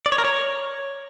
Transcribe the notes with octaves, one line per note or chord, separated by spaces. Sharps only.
D5
C#5
A#4
C#5